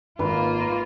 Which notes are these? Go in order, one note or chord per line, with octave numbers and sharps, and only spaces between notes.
G#1 A#3 F4 B4